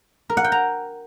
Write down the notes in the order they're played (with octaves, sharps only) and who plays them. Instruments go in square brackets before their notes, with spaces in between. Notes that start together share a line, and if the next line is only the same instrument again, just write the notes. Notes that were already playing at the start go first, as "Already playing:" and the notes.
[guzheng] A#4
F#5
G5
A#5